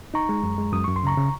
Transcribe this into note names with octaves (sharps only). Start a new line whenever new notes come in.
D#4 A#5 C#6
G#3
F#2
G#3
F#2 D#6
F#2 C#6
C6
C#3 A#5 C#6
C#3